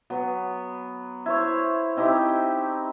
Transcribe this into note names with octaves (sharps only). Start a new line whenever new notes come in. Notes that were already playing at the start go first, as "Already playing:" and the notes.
F#3 B3
E4 C5 C#5
C4 D#4 E4 G4